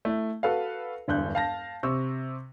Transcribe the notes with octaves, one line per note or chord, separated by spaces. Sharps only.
A3 E4
F#4 A4 B4 F5
E1 D2 G2 F#6 G6
F5 A5 A#6
C3 C#6 E6